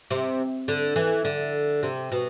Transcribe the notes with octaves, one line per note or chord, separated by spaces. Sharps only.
C3
D3
E3
D3
C3
B2